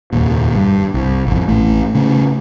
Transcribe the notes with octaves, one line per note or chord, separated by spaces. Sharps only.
F1 D#2 A#2
G2
C2
G#1 F2
A1 A3
C#3 A3